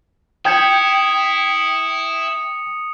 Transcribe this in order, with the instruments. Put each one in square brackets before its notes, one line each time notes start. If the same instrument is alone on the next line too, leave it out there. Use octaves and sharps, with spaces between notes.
[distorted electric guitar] E4 [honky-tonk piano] G5 G6 G#6 [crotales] D#6 C#7